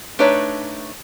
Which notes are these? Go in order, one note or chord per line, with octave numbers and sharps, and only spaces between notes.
A3 D4 D#4 B4 C#5 A#5